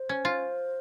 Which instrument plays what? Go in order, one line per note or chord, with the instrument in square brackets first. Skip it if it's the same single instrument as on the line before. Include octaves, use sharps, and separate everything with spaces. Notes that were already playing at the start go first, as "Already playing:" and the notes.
Already playing: [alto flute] C5
[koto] C#4
F4